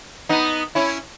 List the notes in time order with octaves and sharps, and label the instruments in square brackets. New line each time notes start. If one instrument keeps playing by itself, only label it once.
[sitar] B3 D#4
C#4 E4